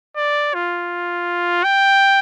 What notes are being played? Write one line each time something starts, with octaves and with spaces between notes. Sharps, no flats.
D5
F4
G5